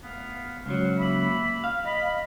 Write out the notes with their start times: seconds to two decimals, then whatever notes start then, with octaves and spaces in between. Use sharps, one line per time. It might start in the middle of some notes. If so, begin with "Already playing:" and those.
0.03 A3 B3 F5
0.66 C#2 F#3 C5 F5 F#5
0.98 A#3 E5 B5
1.64 F5
1.85 D#5 B5